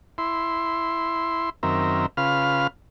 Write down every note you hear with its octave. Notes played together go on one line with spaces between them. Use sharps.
E4 C6
F#2 D#3 C4 A#4 E5
C#3 F4 B4 F5 F6